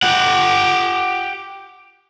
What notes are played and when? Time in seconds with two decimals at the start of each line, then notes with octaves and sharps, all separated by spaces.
0.03 G4 F#5